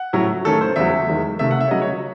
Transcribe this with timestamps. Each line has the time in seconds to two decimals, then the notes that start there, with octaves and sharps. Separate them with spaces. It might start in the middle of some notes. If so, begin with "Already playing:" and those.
Already playing: F#5
0.13 A2 F#3 C#4 E4
0.45 D#3 A3 C#4 A4
0.61 C5
0.76 E2 C#3 F#3 E5
1.08 E2 D#3 G#3
1.39 C3 D#3 A3 E5
1.51 F#5
1.61 E5
1.67 C#5
1.71 C#3 F#3 C#4 D#5
1.82 C#5